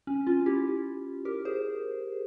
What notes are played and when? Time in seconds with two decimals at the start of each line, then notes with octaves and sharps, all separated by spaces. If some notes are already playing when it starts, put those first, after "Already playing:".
0.07 C#4
0.27 C#4 F4
0.46 E4 G4
1.25 G4 A#4
1.45 G#4 C5